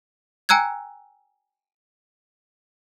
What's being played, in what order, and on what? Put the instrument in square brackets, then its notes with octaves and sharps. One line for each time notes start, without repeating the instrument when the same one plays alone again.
[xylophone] G5 G#5 A#5 E6 F#6 G#6